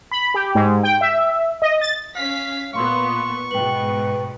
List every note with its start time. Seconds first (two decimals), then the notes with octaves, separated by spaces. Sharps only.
0.11 B5
0.34 G4
0.55 G#2
0.83 G5
1.01 E5
1.62 D#5
1.81 A6
2.16 C#4 F5 B6
2.74 A#2 B3 F5 C6 C#6 E6
3.51 G#2 B2 B4 G5 F#7